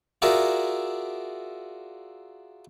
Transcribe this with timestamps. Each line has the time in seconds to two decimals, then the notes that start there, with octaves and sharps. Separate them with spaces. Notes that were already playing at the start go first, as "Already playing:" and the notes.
0.22 F4 F#4 G#4 A#4 D5 E5